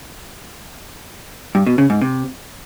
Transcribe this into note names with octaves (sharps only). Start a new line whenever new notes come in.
G2
B2
C#3
G#2
C3